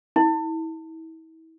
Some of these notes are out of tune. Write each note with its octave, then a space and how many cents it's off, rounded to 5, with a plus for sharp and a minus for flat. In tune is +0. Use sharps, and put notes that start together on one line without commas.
E4 -35